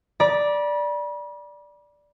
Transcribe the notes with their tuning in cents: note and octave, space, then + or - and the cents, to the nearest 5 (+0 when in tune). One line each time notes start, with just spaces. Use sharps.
D5 +0 B5 -40